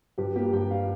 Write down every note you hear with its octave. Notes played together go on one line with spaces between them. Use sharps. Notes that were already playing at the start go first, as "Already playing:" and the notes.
G2 G4
A#3 G4
G2 G5
G3 F5